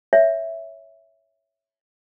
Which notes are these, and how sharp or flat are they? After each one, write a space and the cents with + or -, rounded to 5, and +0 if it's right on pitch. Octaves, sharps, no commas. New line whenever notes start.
C#5 +0 E5 +0